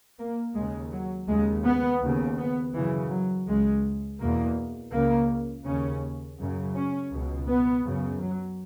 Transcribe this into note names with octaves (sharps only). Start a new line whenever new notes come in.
A#3
D#2 C#3 G#3
F#3
D#2 C#3 G#3
B3
D#2 C#3
B3
F#2 C#3 E3
F#3
C#2 C#3 G#3
E2 B2 A#3
C#2 C#3 A#3
D#2 C#3 C#4
F#2 C#3
C#4
C#2 B2
B3
F#2 C#3
F#3